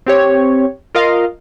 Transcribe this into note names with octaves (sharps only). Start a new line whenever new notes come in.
C4 G4 C#5
F4 A#4 D#5 F5